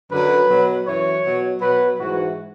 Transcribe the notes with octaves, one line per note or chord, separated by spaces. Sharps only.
F#2 D3 F#3 B4
B2 F#3
F#2 E3 C#5
B2 F#3
B2 F#3 B4
G#2 E3 F#4